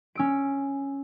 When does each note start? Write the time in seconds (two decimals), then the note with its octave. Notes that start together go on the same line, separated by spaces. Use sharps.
0.15 C#4 E6 D7